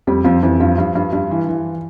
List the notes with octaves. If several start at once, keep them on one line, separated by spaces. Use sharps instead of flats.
F2 G3
F2 F3
F2 E3
G2 F3
G2
G2
G2
E3
E3